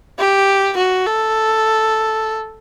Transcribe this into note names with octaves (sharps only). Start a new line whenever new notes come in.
G4
F#4
A4